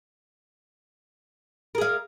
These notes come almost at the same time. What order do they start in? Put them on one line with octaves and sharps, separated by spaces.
A#4 G#4 F5